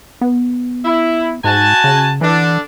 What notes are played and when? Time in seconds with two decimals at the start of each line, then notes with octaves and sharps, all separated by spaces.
0.21 B3
0.84 E4
1.44 G#2 F#4 G#5 A5
1.84 C#3
2.21 D3 E3 D4